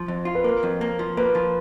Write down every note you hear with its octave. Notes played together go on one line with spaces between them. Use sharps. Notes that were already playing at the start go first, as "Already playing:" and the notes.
Already playing: F3
F2
F4
B4
A#3 A#4
F2
A#3
F3
A#3 B4
F3